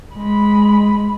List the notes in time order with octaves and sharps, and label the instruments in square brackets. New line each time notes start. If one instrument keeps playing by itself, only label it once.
[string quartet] G#3 B5